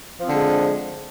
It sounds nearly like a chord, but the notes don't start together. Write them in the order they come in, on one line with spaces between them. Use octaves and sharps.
F3 C4 D3 G#3